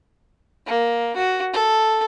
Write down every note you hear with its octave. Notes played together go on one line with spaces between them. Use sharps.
A#3
F#4
A4